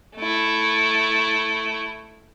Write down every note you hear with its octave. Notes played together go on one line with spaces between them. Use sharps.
A3 E4